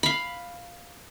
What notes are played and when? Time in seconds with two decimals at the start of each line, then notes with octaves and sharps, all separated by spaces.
0.03 F5 B5